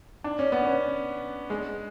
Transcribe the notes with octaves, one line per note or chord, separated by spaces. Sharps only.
D4
C#4
B3
C#4
G#3